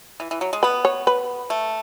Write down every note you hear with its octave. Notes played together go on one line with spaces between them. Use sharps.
E3
E3
F#3
G#3
B3 B4
C#5
B4
A3